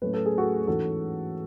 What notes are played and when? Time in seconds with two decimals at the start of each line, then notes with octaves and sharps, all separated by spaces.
0.02 A2 F#3 A3 C#4 B4
0.14 A4
0.26 G#4
0.38 F#4 A4
0.67 G#2 E3 G#3 C#4 F#4 A4